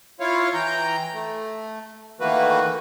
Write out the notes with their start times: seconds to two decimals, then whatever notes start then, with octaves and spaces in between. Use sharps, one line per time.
0.20 E4 F4 C#5 F5
0.54 E3 G5 A#5 G6
1.13 A3
2.20 D#3 E3 A3 A#3 F#4 B4